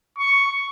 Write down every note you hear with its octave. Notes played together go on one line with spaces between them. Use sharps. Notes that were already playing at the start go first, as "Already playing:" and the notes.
C#6